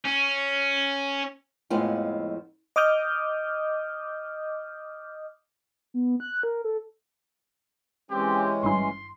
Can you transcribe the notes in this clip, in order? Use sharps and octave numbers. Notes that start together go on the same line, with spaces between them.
C#4
F2 A2 F3 G#3 B3 F4
D#5 D6 D#6 F6 G6
B3
F#6
A#4
A4
E3 G#3 C4 C#4 G4
G#1 G2 E4 C6